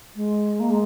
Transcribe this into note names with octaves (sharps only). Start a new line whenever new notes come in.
G#3
A#3
G#3